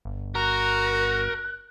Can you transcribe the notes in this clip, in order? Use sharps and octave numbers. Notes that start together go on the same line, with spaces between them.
G1
F#4 A#4 F#6